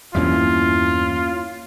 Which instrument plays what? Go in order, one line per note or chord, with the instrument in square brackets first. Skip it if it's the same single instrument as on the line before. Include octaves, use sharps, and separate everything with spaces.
[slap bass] E2 G2 G3 [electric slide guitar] A#3 C#4 E4 [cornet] F4